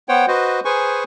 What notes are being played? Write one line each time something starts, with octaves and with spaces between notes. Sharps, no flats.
B3 C5 C#5 F#5 G5
F#4 B4 C5 D#5
G#4 B4 C5 G#5 C#6